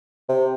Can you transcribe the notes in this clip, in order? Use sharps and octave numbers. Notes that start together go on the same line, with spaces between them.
C3